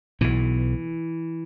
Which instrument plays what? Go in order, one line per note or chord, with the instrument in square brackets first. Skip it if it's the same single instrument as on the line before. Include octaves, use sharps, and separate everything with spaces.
[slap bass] B1 B2 E3